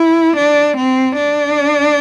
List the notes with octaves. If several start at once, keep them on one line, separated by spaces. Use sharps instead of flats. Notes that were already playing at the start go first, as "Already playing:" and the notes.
Already playing: E4
D4
C4
D4